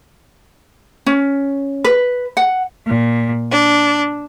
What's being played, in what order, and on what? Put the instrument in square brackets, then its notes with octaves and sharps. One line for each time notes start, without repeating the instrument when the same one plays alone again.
[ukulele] C#4
B4
F#5
[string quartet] A#2
D4